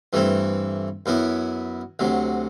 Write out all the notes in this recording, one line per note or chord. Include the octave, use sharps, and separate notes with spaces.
G2 E3 A3 C4
F#2 F#3 B3 E4
D2 C3 F#3